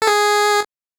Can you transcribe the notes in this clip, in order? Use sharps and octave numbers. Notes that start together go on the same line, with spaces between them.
A4
G#4